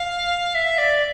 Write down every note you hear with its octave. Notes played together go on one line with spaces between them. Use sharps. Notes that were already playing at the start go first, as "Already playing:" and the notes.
Already playing: F5
E5
D5